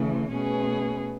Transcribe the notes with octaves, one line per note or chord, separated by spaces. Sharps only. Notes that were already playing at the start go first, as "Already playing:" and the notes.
Already playing: C#3 E3 A3
B2 A3 C#4 G#4 B4